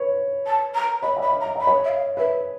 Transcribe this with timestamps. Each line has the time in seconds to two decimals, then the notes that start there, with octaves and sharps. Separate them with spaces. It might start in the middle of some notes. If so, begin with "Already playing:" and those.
Already playing: B4 C#5
0.46 A5
0.75 A#5
1.02 C#5 D#5 B5
1.17 D5 E5
1.22 B5
1.31 D#5 F5
1.41 A#5
1.46 D#5
1.56 E5 B5
1.67 C#5 D#5
1.84 E5
1.89 F5
2.17 B4 E5